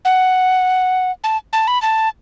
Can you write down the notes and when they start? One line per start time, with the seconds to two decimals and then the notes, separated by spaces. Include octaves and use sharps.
0.05 F#5
1.24 A5
1.53 A5
1.68 B5
1.82 A5